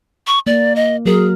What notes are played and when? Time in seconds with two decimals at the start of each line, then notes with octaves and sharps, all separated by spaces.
0.27 C#6
0.47 A#3 D5
0.76 D#5
1.06 F#3 G#4 A#4